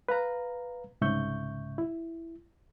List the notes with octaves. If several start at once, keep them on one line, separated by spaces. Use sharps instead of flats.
B4 F5 A#5
C2 G#2 C#3 E5 C#6 G6
E4